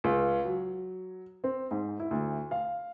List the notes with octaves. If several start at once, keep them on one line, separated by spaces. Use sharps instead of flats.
C#2
F#3
C4
G#2
E4
D2
F5